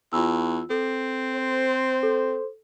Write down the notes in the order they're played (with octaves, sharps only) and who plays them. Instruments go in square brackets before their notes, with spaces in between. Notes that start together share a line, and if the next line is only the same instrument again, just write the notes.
[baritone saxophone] E2 [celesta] F4 E6
[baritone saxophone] C4 [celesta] A4
[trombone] C5
[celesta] A4